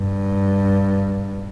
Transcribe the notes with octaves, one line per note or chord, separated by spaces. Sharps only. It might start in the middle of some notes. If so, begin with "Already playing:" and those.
Already playing: G2